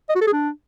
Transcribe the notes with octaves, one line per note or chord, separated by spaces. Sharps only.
D#5
F#4
A4
G#4
D4